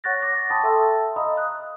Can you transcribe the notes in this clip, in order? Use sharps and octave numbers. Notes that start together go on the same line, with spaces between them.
C#5 F#5 C#6 F#6 A6 A#6
D6 A#6
G5 A5 B5 C#6 D#6 A6
A4 E5 G5 A5 C6 E6
D#5 F5 A#5 B5 D#6
D#6 F#6